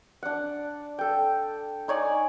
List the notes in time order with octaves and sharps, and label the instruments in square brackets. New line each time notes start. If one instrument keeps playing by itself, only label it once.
[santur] D4 F#5
A4 G5
D#4 C#5 D5 G#5